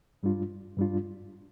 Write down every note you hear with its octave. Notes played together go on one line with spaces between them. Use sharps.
G2 G3 D4 F4
G2 G3 D4 F4